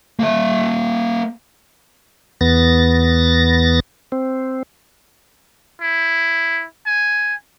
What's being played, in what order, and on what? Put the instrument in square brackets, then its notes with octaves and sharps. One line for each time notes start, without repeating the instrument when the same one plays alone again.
[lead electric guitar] A#3 E5
[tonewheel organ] E2 B3 A6 A#6
C4
[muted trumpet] E4
G#5